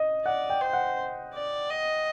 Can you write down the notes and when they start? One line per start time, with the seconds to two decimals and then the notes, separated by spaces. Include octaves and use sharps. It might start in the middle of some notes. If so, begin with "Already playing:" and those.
Already playing: D#5
0.25 D5 F#5
0.50 G5
0.61 C5
0.73 F#5
1.34 D5
1.71 D#5